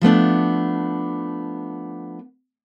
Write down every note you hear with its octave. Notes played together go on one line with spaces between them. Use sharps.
F3 A3 B3 D4